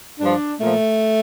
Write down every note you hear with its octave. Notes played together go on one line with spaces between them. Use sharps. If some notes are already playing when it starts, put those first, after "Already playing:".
G2 F3 D4
A#2 F3 A3